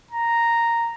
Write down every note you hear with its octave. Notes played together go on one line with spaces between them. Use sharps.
A#5